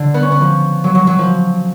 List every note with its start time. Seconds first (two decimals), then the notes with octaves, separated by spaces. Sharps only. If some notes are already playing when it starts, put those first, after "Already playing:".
Already playing: D3
0.14 B3
0.22 C#4
0.32 B3
0.41 F3
0.84 F#3
0.95 F#3
1.07 F#3
1.19 F3